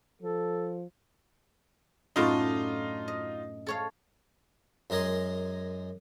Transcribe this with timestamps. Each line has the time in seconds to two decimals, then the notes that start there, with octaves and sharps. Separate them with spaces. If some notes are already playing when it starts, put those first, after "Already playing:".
0.22 F3 A4
2.16 F#2 A2 D4 D#4 F4
3.08 D#5
3.67 A4 C#5 F5
4.90 F#2 G#3 A#4 D#5 G#5 C6